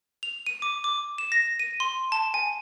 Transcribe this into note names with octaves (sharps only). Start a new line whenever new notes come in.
F7
D#7
D6
D6
E7
A#6
D#7
C6
A5
G#5